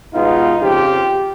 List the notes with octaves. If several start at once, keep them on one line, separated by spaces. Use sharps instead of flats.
B2 G#3 B3 D#4 F4
F2 C#3 F3 F4 G4